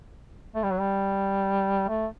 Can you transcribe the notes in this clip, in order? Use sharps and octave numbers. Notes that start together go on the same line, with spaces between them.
A3
G3
F#3
G3
A3